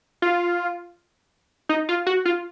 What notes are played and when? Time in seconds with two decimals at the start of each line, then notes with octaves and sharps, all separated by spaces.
0.22 F4
1.69 D#4
1.89 F4
2.06 F#4
2.25 F4